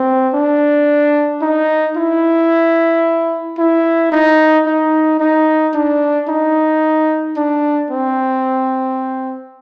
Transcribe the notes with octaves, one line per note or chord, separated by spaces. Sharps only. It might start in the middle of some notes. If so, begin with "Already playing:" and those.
Already playing: C4
D4
D#4
E4
E4
D#4
D#4
D#4
D4
D#4
D4
C4